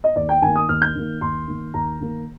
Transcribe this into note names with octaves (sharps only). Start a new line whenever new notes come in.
D#5
D#2 D5
G5
D#3 A#3 G#5
D#6
D#2 F6
G6
D#3 A#3
D#2 C6
D#3 A#3
D#2 A#5
D#3 A#3